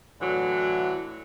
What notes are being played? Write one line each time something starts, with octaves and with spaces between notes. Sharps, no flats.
A2 D3 E3 F#3